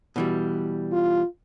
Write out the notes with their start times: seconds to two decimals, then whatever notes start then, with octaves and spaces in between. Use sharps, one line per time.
0.16 B2 E3 G3
0.92 F4